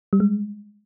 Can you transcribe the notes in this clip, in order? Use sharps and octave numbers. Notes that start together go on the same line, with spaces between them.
G3
G#3